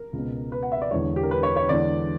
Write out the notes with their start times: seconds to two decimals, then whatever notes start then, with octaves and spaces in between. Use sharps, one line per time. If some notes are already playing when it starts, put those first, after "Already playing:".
Already playing: A#4
0.13 C#2 B2
0.52 B4
0.63 F#5
0.72 E5
0.82 D5
0.91 E1 E2 D3 C#5
1.16 G4
1.23 A#4
1.31 B4
1.43 C#5
1.56 C#5
1.69 E1 E2 D3 D5